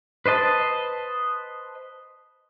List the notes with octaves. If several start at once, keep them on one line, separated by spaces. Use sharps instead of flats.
B4 C5 D#5 A5